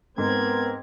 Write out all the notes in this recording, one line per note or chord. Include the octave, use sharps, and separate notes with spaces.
G#2 B3 C4 A#4 G#6